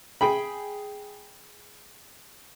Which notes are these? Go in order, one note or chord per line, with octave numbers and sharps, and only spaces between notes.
G#4 G5 B5